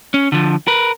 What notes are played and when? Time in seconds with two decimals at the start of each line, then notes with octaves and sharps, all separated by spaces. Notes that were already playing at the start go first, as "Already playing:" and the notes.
0.14 C#4
0.32 D3 F3
0.67 A#4 B4